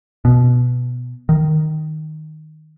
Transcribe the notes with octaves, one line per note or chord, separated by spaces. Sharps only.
B2
D#3